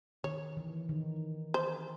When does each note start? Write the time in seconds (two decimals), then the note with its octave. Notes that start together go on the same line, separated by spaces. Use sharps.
0.24 D#3 C#5
0.57 E3
0.89 D#3
1.54 C5